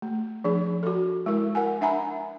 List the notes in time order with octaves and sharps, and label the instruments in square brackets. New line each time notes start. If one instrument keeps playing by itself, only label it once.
[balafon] A3
F3 D4 G#4
F#4 A4
G#3 E4 A#4
A#4 F#5 G#5
D4 E5 F#5 G#5 A#5 B5